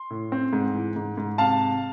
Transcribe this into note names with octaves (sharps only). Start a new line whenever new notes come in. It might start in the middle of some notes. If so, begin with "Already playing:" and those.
Already playing: C6
A2
C4
G#2
E3
G#2
G#2
C3 F5 A5